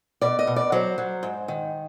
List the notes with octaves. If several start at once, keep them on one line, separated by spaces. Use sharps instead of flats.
B2 D5
D#5
B2
D5
F#3 C5
F#3
G#2
D#3